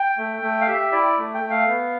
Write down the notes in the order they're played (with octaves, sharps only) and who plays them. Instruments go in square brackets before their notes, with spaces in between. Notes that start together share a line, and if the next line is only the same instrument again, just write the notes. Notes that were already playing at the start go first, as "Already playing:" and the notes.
Already playing: [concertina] G5
A3
A3
F5
G4 E5
E4 D5
A3
G5
A3
F5
B3